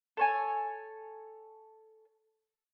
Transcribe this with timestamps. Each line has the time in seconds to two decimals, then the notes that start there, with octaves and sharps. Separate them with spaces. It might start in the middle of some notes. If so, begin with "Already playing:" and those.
0.17 A4 C#5 G#5